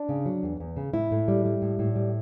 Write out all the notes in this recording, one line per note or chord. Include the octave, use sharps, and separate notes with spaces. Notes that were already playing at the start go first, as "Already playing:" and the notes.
Already playing: D4
C#3
F#3
E2
E2
C#3
A2 E4
A2
G3
G3
A2
A2
G3